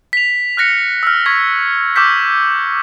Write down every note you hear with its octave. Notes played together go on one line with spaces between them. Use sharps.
B6 F7
F6 F#6 A#6 C#7
E6 F6
C#6 G#6 B6
C#6 D6 E6 F6 G6 B6